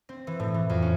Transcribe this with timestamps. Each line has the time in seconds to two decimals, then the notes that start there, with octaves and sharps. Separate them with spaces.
0.09 C4
0.27 E3
0.40 A2
0.54 E3
0.70 F2
0.82 C#4